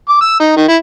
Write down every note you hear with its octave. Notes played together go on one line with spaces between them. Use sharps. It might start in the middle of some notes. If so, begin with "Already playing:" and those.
D6
E6
D#4
D#3
E4